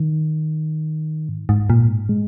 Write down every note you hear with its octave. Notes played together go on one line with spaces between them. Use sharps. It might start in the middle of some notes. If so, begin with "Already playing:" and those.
Already playing: D#3
G#2
G#2
A#2
G#2
G#3